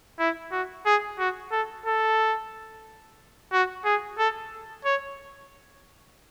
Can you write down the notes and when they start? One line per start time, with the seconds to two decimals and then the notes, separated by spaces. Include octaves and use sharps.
0.19 E4
0.52 F#4
0.86 G#4
1.19 F#4
1.52 A4
1.86 A4
3.53 F#4
3.85 G#4
4.19 A4
4.85 C#5